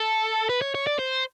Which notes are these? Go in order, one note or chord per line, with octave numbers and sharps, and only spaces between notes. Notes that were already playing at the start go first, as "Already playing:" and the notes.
Already playing: A4
B4
C#5
C#5
D5
C5